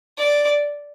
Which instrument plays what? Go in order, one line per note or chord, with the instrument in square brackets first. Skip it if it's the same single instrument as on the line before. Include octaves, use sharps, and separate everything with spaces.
[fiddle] D5